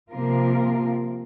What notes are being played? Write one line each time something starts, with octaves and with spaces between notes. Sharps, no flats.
C3 F3 A#3 F4 A#4